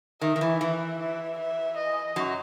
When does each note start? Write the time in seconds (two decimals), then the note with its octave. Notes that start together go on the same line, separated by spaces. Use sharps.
0.21 D#3 E5
0.36 D#3
0.41 E3
0.60 E3 E5
0.99 E5
1.38 E5
1.77 D#5
2.16 F#2 F#3